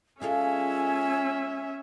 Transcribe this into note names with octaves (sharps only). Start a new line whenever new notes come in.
G#3 C#4 F4 A4 E5 G#5